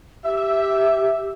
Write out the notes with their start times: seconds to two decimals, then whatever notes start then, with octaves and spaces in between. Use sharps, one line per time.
0.25 G4 E5